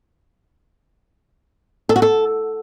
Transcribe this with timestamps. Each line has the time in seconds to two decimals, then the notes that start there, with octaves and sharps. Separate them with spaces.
1.89 A4
1.96 F#4
2.02 A4